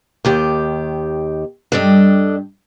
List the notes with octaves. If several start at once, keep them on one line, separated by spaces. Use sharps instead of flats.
D#2 D#3 G4
G2 G3 D4 A4 D#5